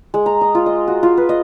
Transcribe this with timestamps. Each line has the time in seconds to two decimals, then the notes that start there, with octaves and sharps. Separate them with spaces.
0.14 G#3
0.26 A#5
0.41 D#5
0.55 F4
0.66 D#5
0.88 F#4
1.03 F4
1.17 B4
1.29 D#5